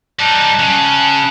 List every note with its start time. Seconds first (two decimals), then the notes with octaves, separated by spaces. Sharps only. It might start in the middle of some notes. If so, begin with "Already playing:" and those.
0.19 G3 D#4 A5 F#6
0.59 C#3